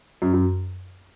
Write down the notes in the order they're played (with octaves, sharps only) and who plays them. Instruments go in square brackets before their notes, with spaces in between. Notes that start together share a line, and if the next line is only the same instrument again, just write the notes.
[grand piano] F#2
F#2